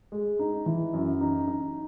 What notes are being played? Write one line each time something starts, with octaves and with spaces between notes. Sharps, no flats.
G#3
D#4
E3
F#2
D#4
D#4